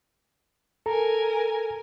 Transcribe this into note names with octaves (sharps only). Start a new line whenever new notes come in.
A4 A#4 G#5 A#5